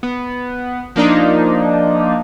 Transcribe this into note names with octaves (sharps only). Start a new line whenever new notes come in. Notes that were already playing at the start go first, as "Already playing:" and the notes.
B3
F3 A#3 D4 D#4